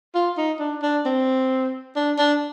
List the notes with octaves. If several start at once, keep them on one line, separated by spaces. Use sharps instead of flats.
F4
D#4
D4
D4
C4
D4
D4